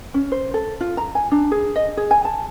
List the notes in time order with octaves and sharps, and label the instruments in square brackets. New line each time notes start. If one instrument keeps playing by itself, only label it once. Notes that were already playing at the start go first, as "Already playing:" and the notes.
[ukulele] C#4
C5
A4
F4
A#5
G#5
D4
G#4
D#5
G#4
G#5
A5